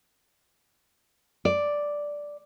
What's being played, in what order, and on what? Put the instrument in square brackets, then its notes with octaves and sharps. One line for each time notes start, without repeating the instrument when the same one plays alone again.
[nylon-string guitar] D5